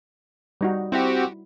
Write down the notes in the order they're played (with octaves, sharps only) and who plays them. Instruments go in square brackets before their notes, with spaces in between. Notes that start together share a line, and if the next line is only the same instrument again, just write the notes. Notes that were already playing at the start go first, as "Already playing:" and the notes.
[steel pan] G3 D#4 F#4
[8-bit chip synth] C4 F#4 G4 [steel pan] E4